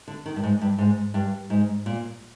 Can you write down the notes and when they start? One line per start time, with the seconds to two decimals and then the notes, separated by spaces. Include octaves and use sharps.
0.08 D3
0.26 D#3
0.36 G2
0.43 G#2
0.61 G2
0.78 G#2
1.14 G2
1.50 G#2
1.86 A#2